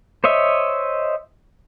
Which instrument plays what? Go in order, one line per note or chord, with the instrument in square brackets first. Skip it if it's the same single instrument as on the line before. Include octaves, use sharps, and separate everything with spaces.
[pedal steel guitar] C5 C#5 D#5 E5